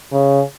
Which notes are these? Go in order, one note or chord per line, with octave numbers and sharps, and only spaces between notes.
C#3